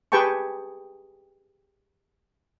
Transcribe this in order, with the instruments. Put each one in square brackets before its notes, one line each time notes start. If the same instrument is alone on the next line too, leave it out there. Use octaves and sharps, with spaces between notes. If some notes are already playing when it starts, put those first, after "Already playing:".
[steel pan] G4 G#4 B4 G5 A5 C#6